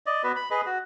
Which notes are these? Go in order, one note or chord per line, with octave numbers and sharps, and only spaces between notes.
D5 D#5
B3 F#4 B4
B5
G#4 B4 D#5
F#4